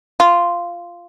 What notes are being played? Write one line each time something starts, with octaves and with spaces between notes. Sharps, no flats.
F4